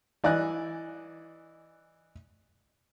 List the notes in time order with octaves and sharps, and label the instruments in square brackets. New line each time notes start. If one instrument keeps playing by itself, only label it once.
[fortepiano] E3 D5 D#5 G#5 F#6